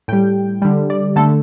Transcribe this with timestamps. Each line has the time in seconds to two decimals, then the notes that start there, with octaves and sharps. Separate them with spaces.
0.08 A2 G3 G5
0.62 D3 G3
0.90 D5
1.16 D3 A3 A4